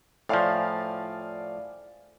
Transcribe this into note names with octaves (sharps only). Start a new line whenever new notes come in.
A2 F3 D5 F5 G#5